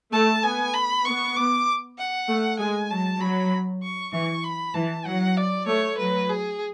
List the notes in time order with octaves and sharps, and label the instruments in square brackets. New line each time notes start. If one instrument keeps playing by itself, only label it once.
[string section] A3 [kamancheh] A5
[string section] B3 [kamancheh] G#5
[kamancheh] B5
[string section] B3 [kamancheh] C#6
[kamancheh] D6
F#5
[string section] A3
[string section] G#3 [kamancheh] G#5
[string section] F#3 [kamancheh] A5
[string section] F#3 [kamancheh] B5
[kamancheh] C#6
[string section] E3 [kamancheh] C#6
[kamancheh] B5
[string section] E3 [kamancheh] A5
[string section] F#3 [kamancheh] F#5
[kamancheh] D5
[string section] A3 [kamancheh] C#5
[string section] F#3 [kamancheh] B4
[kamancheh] G#4